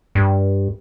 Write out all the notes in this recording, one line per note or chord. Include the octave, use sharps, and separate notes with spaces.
G2